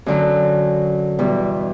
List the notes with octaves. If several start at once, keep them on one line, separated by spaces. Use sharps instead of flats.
F#2 D3 F#3
E2 B2 G3